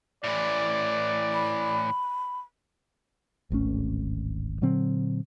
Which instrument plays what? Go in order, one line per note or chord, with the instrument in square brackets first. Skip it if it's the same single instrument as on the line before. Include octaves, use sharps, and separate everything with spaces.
[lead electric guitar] A2 E3 [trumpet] D5
[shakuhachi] B5
[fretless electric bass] D1 G#1 A3 C#4
A#2 D3 F#3 C4